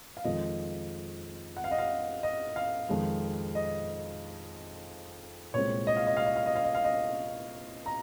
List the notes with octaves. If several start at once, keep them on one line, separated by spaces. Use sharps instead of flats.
F5
F2 D#3 G#3 C4 F4 D#5
F#5
F5
D#5
F5
D#5
F5
F2 D#3 G#3
D#5
C2 A#2 G#3 C4 C#5
D#5
F5
D#5
F5
D#5
F5
D#5
F5
D#5
F5
D#5
A#5